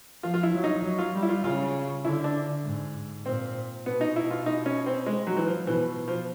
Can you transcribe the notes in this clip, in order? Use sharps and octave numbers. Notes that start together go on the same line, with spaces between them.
F3 F4
F4
E4
F#3
D#4
F#3
F4
G3
E4
F4
C#3 F4
D3 E4
D4
G#2
A#2 C4
B2 B3
D#4
E4
F4
D#4
C#4
C4
G#3
F#3
E3
F3
B2 E3
F3